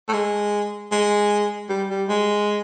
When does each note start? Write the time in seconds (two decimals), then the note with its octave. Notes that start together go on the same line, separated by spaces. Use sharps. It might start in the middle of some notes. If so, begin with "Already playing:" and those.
0.09 A3
0.13 G#3
0.92 G#3
1.70 G3
1.89 G3
2.09 G#3